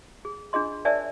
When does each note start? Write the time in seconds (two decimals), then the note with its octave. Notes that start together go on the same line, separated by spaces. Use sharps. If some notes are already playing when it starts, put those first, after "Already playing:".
0.25 G#4
0.53 D4 F4 G#4 D#5 C6
0.85 A#4 C#5 D5 E5 G#5 A5